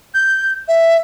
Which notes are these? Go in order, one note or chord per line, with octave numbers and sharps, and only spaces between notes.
G6
E5